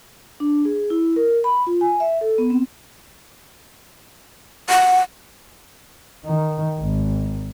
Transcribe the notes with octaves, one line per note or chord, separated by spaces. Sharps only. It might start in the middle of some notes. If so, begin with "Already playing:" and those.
D4
G#4
E4
A#4
B5
F4
G#5
E5
A4
B3
C4
F#5
D#3
G#1